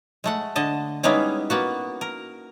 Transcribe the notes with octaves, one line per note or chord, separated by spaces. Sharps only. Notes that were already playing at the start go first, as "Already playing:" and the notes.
G#3 A3 F#5
D3 D#5 A5
G3 G#3 B3 C#4 D#4 E4
A#3 B3 F#4
A#4